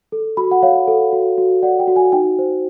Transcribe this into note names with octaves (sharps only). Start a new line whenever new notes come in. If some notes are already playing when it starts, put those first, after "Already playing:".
A4
F#4 B5
F#5
C#5 F5
A4
F#4
F#4
D5 F#5
G5
F#4
G#5
D#4 G5
C5